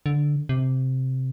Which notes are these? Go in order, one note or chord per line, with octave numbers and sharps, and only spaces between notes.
D3
C3